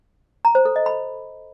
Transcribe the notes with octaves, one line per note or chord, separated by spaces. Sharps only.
A#5
C5
A4
D#5
B5